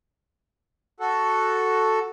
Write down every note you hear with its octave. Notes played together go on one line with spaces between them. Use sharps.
F#4 A4